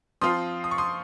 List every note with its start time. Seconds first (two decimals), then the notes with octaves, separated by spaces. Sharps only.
0.21 F3 C4 F4 C6 D#6
0.64 D#6
0.71 C#6
0.78 C6 D#6